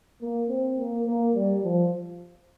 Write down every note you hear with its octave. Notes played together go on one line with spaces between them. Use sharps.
A#3
C4
A#3
A#3
G3
F3